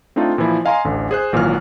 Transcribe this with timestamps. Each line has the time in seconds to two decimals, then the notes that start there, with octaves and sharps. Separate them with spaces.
0.16 A3 C4 D4 D#4 F4
0.38 A#2 E3 F3 E4
0.65 D#5 F5 G#5 A#5 C6
0.85 A1 D2 D3
1.11 G#4 C5 F#6
1.33 G#1 A#2 E3 F#3 F6